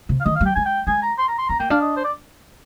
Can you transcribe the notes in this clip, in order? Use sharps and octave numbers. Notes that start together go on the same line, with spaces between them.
C3
F5
D#3 D#5
F5
G3
G5
G#3 G#5
G5
G#3 G#5
A#5
C6
A#5
C6
C4 A#5
A#3 G5
D4 F5
D#5
C5
D5